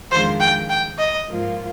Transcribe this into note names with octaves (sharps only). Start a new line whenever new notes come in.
F2 D#3 G#3 D4 F4 C5
G5
G5
D#5
G#2 F3 A#3 F4